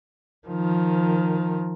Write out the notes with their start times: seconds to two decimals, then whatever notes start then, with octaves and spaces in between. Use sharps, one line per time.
0.47 D#3 F3